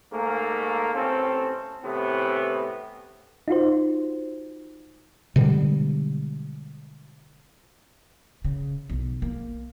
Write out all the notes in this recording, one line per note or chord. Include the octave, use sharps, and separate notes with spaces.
G#2 A3 A#3
A1 C4 C#4 A4
A2 C3 E3 B3
D#4 F4 F#4 C5
B2 D3 G3 G#3
C#3
B1
A#3